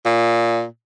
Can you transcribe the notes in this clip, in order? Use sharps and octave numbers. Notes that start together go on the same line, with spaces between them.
A#2